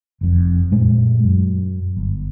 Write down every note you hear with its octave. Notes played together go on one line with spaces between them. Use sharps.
F1 F2
F#2 A#2 G#3 A3
F#2
G1